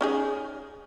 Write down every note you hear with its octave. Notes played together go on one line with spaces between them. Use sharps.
C#4 D#4 G#4